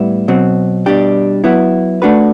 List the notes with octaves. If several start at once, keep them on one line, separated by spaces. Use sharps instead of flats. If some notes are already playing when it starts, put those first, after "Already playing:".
Already playing: A2 G3 B3 E4
B2 F#3 C4
B2 G3 D4 G4
F#3 B3 E4
A3 D4 F#4 B4